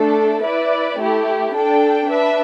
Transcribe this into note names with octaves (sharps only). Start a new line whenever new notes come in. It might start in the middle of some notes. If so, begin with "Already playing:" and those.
Already playing: A3 D4 A4
E4 B4 D5
A3 E4 G4
D4 A4 G5
D4 B4 E5